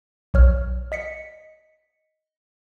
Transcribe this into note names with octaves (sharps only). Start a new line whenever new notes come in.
B1 C#5 F6
D#5 B6 C#7